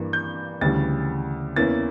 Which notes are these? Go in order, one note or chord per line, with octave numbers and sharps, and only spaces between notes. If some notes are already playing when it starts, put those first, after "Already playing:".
Already playing: G2 E3 A#3
G6
D2 C#3 E3 G3 A6
E2 E3 A#3 C#4 E4 A6